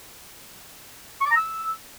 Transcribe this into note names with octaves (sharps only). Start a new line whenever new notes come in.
C#6
D6
A#5
E6